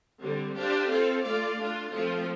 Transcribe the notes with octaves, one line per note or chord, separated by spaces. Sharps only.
D3 G3 C4
D4 G4 C5 F5
C4 F4 A4 F5
A3 F4 D5 F5
A3 D4 F4
F3 A3 C4 F4